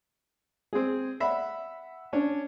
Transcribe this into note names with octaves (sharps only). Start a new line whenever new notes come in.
C4 G#4
E5 F#5 B5
C#4 D4 C#5